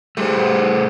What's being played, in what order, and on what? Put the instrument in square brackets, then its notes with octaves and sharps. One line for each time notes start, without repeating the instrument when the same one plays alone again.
[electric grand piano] G3 [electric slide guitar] A3 G#4 C5